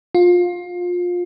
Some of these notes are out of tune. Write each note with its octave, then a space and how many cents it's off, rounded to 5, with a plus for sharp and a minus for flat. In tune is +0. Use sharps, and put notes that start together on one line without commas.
F4 +25